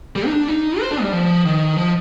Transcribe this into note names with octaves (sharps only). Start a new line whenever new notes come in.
G3
D#4
D4
D#4
C5
D4
G3
F3
D#3
F3